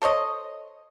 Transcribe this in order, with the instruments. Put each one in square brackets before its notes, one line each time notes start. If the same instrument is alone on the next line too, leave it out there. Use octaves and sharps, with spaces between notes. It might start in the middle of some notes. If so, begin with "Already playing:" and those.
[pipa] A4 C5 C#5 D#5